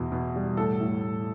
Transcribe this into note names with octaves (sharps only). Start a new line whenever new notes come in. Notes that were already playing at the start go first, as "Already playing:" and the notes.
Already playing: E2 B2
B2
G3
A2 A4
A2